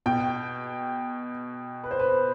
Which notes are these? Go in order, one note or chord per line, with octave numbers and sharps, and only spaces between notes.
B2 G5
B4
C5
B4